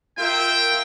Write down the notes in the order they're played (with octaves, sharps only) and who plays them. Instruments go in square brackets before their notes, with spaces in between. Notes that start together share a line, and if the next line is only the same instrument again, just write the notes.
[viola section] F4 A#4 E5 [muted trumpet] G5